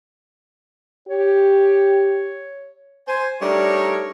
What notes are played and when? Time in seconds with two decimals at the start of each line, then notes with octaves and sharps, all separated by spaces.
1.08 G4 C#5
3.07 C5 G#5
3.41 G3 A3 D4 D#4 A#4 C#5